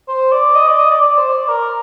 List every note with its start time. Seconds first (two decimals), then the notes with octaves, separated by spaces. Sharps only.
0.08 C5
0.32 D5
0.55 D#5
0.67 D5
0.79 D#5
0.91 D5
1.02 D5
1.18 C5
1.33 D5
1.48 A#4